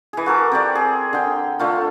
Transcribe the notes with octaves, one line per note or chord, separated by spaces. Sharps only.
E3 G#4
F#4 A4 A#4 D6
C4 G4 D5
G#4
D3 G5
D3 A3 F4